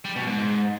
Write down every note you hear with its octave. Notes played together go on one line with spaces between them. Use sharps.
G3
B2
G#2